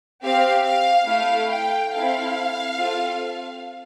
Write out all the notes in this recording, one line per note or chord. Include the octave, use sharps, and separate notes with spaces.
C4 G4 F5
F5
A3 E4 A4 F5
G5
C4 E4 A4 F5
C4 F4 A4